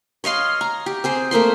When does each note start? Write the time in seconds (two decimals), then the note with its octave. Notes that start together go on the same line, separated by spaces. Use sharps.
0.24 C#5 D#5 F5 C6
0.61 A#5
0.86 G4
1.04 C4 G#4 C5
1.31 A3 A#3 C5 C6